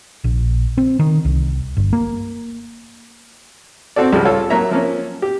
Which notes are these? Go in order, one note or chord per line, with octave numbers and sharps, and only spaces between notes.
A#1
C4
D#3
C2
G1
A#3
C4 F#4 A4 D5
C#2 F3 G3 G#3
F4 A4 C#5
F#3 A#3 C#5 E5 A#5
F3 A#3 C#4
G4